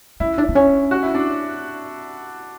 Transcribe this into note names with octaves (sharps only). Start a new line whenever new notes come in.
C#4 E4
D4
B3
C#4
F#4
E4
D4